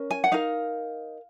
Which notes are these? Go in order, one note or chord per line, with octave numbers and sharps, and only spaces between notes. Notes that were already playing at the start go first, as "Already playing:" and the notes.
Already playing: C#4 A#4
G#5
F#5
D#4 A#4 F5